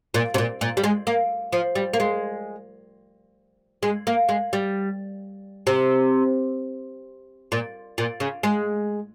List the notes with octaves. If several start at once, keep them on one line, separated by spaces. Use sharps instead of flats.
A#2
C3
A#2
A#2
G3
G#3
A#3
F3
G3
A#3
G#3
G#3
A#3
G#3
G3
C3
A#2
A#2
C#3
G#3